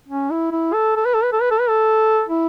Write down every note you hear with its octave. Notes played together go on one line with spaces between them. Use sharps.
C#4
E4
E4
A4
A4
B4
A4
B4
A4
B4
A4
B4
A4
E4